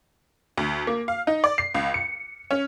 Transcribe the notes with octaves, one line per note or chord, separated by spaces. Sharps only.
D2
A#3
F5
D#4
D5
C7
C#2
C#7
C#4